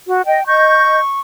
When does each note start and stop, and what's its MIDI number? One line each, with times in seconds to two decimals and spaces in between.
0.07 0.22 66
0.26 0.39 75
0.26 0.46 79
0.46 0.98 75
0.46 1.20 85
0.46 0.98 91